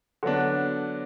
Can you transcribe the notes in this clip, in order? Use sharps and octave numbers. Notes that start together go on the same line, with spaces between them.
D3 F#3 B3 D4